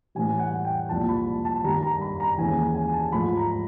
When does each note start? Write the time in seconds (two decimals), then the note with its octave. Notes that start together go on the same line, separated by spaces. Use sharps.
0.15 A2 E3 G3 G#5
0.39 F#5
0.65 G5
0.89 C2 A#2 F3 A5
1.09 B5
1.45 A5
1.63 G2 D#3 G3 A#5
1.83 A#5
2.01 B5
2.20 A#5
2.38 D#2 C#3 E3 G#5
2.75 G#5
2.93 A5
3.12 G#2 F3 A3 B5
3.37 A#5